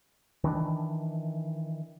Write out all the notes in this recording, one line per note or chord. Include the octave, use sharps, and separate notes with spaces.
D#3 E3 D4